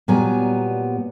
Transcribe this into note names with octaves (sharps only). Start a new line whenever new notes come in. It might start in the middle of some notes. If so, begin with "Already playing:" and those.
A#2 F#3 G3 B3 G#5 A#5